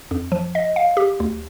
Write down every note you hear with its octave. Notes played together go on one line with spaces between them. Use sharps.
F2
F3
D#5
F5
G4
D2